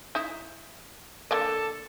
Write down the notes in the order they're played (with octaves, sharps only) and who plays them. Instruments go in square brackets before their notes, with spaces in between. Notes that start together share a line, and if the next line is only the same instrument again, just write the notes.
[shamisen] D#4 E4
[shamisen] D3 A#3 D5 [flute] A4